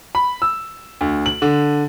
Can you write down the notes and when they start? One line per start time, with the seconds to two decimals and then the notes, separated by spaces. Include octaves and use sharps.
0.15 B5
0.42 E6
1.01 D2
1.26 F#7
1.42 D3